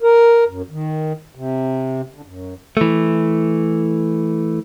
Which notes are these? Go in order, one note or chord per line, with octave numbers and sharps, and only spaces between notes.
A#4
F#2
D#3
C3
D3
F#2
E3 A3